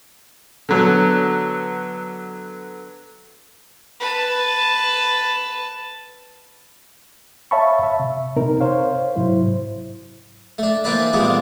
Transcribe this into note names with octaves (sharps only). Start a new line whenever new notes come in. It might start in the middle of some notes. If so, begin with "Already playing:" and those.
D3 F#3 B3
B4 A5
C#5 E5 F5 A5 B5 C#6
E5
C3
C3 C4 D#4 A#4
C5 C#5 F5
G#2 C3 F#3 E4 C5
A3 D4
E3 A#3 C4 D4 B4 D5
A1 G2 A#2 G#3 B3 D6